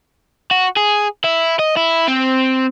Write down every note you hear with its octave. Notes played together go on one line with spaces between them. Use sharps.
F#4
G#4
E4
D#5
E4
C4